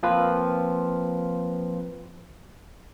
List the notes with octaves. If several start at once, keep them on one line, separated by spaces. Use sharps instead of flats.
F3 A#3 C4 F4 B4